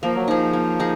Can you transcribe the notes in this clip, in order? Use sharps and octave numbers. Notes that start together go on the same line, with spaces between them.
F3 A#3
F#3
F3 D#4 G#4
A#3
D#4 G#4